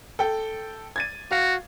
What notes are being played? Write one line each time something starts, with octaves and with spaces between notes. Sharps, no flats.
A4 G5
G#6 A6 D#7
F#4 F5